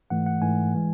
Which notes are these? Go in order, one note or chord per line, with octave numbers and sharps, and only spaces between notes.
G#2 E3 A3 F#5
F#5
G#2 E3 A3 G#5
E3 G#3